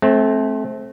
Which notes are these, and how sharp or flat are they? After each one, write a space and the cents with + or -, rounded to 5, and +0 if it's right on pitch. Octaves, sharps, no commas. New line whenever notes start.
A3 -25 C4 +15